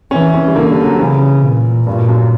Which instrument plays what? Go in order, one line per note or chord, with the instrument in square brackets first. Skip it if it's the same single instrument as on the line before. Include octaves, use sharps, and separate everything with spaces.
[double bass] E3 [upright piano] C#4
[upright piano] C#4
G3
[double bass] D3 [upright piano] A#3
[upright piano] G3
F#3
[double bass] C#3 [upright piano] E3
[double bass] A#2
[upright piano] G2 [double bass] A#2
[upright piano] F#2
F#2